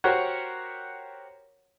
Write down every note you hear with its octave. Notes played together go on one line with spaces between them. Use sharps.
F#4 G4 A#4 C5 C#5 F#5